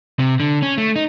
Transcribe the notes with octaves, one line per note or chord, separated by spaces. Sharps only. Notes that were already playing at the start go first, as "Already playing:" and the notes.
C3
D3
C#4
A3
D#4